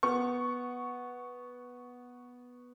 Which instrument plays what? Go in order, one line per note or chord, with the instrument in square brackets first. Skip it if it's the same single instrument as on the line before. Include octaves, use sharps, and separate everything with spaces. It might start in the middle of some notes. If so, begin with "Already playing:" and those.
[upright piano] B3 C#6